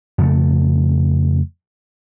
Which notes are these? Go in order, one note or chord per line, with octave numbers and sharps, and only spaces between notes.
F2 C#3 A3